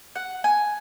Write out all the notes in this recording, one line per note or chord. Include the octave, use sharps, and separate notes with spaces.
F#5
G#5